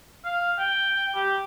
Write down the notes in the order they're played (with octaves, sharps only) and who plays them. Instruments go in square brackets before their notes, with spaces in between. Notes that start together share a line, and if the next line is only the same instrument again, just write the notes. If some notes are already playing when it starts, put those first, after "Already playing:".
[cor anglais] F5
G5
G4